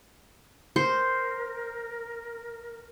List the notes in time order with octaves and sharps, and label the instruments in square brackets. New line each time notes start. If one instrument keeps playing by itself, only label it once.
[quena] A#4 [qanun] C5